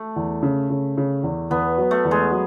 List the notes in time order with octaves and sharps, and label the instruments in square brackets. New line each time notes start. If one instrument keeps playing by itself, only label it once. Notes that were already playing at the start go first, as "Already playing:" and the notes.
Already playing: [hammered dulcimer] A3
[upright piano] E2
C#3
C#3
C#3
E2
[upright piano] E2 [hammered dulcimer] B3
[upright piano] F#3
[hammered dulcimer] A3
[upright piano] E2
[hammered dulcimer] G#3
[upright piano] F#3